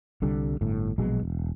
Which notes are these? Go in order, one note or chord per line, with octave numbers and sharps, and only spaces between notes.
C2 D3 G3
G1 A2
A#1 B2 F#3 G#3
E1